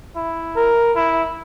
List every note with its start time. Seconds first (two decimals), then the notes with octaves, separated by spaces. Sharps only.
0.16 E4
0.56 A#4
0.96 E4